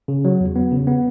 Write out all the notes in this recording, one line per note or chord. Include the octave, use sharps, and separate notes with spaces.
C#3
F#3
E2
B3
C#3
B3